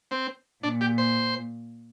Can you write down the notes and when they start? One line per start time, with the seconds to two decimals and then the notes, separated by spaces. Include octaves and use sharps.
0.11 C4
0.63 A#2 D4
0.81 G4
0.98 C5